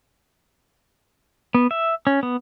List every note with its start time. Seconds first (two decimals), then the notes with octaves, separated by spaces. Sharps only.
1.55 B3
1.71 E5
2.07 C#4
2.23 B3